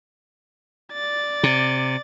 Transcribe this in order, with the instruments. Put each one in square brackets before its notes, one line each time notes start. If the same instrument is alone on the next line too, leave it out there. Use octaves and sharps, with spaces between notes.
[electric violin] D5 A6
[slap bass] C3